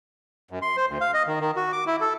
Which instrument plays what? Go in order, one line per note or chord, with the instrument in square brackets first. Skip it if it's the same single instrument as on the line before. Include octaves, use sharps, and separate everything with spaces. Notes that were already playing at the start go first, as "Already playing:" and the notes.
[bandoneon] F#2
C6
C5
D2
F5
D#5
D#3
D#3
F#4
D6
E4
A4